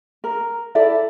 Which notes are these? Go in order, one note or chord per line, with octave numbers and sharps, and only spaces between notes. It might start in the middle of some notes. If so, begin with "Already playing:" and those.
A#4
E4 A4 D5 E5